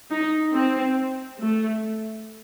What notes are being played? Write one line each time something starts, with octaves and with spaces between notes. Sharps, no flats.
D#4
C4
A3